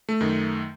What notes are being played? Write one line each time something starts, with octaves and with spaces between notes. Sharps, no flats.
A3
F#2 D#3